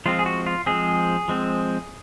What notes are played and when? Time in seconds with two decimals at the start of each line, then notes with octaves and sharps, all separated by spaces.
0.06 F3 G#3 C4 F4
0.19 G#4
0.26 F#4
0.46 F4
0.66 F3 G#3 C4 G#4
1.28 F3 G#3 C4